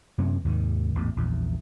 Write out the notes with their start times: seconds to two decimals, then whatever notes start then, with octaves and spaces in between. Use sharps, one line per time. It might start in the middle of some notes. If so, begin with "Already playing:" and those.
0.18 F#2 C3 B3 C#4
0.45 D#2 G#2 C3 D#3
0.95 A1 E2 G#2
1.16 A#1 E2